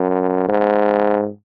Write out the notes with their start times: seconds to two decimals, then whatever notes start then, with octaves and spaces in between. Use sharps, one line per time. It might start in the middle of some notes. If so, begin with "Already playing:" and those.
Already playing: F#2
0.49 G#2